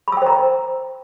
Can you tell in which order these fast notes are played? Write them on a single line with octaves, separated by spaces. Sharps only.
B5 E6 G5 C5 A#5